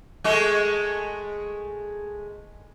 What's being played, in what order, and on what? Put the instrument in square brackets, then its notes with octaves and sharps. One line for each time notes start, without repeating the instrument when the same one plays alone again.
[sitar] G#3 A3 F#4